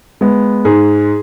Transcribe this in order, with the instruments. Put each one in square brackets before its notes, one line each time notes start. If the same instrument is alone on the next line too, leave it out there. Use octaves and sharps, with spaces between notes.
[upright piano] G#3 B3
G#2 G#4